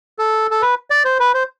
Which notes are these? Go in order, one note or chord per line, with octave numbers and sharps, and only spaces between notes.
A4
A4
B4
D5
C5
B4
C5